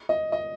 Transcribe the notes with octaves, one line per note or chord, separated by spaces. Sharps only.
D#5
D#5